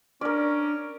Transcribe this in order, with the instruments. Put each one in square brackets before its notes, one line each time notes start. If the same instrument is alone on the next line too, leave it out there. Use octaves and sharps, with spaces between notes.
[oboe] C#4 [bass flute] D4 [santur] A#4 D5